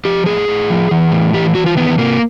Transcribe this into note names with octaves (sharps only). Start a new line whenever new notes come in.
F3 G4
A2 G#4
A2
F3
E3
A2
E3 G4
E3 F#4
F4
D#3 B3
C3 A#3